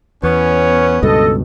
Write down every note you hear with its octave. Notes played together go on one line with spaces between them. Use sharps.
E2 B3 C#4 C#5
C#2 G2 B2 A4 D#5